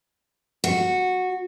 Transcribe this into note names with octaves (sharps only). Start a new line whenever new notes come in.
F#4